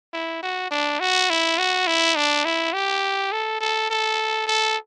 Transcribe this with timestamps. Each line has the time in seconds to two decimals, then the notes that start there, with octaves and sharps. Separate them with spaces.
0.13 E4
0.43 F#4
0.71 D4
1.00 F#4
1.30 E4
1.59 F#4
1.87 E4
2.16 D4
2.45 E4
2.73 G4
3.32 A4
3.61 A4
3.90 A4
4.47 A4